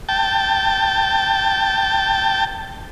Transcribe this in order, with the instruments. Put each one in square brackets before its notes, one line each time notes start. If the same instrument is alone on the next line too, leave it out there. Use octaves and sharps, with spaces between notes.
[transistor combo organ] G5 A5